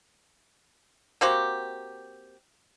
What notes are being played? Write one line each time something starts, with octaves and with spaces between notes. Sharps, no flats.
A#3 C4 F#4 G4